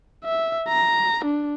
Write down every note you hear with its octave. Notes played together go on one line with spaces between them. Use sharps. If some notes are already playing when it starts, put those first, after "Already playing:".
E5
A#5
D4